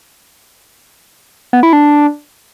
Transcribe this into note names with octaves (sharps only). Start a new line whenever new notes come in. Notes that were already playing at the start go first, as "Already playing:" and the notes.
B3
E4
D4